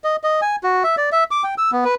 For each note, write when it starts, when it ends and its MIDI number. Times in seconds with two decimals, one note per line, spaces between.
0.04 0.16 75
0.24 0.41 75
0.42 0.56 80
0.63 0.83 66
0.84 0.95 76
0.97 1.10 74
1.12 1.24 76
1.31 1.43 86
1.44 1.55 79
1.58 1.71 88
1.72 1.84 59
1.85 1.95 71